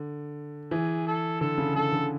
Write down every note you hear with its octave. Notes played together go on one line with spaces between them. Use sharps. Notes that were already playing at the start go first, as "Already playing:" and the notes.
Already playing: D3
E3 G#4
A4
D3 A4
C#3
C#3 A4
D3